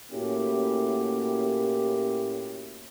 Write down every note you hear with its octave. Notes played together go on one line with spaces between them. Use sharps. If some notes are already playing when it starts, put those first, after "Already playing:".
A2 A#3 C#4 E4 F#4 G4